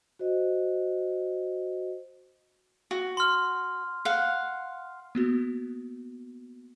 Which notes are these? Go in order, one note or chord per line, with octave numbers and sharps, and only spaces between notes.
F#4 C5 D#5
F#4
C6 F6
F5 F#5
A#3 B3 F#4